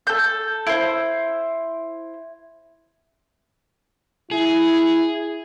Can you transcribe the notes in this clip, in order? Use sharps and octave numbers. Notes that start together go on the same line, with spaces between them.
A4 G6
E4 C5
E4 G#4